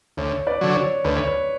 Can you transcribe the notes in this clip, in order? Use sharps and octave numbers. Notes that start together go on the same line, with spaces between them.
D2 C#5
B4 D5
D3 F#3
C#5
D2 B4
C#5
B4